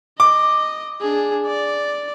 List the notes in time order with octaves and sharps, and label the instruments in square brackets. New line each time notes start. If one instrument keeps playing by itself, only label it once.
[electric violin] D#5 [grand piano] D6
[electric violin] D4 G#4
D5